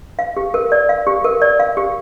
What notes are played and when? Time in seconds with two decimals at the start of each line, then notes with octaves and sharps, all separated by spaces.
0.19 F5
0.37 G4
0.54 A#4
0.72 D5
0.89 F5
1.07 G4
1.24 A#4
1.42 D5
1.60 F5
1.77 G4